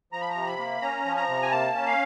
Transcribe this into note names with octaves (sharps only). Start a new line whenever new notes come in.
F3 A#5
B5
A#5
C3
B5
A#3
C#4 A#5
F3
A#5
C3
G#5
A#3 A5
C#4
F5